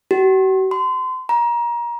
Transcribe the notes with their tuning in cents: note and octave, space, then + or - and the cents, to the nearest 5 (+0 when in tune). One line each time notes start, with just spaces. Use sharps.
F#4 +45
C6 -35
A#5 +25